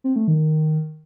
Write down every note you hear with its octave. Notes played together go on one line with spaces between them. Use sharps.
C4
A3
D#3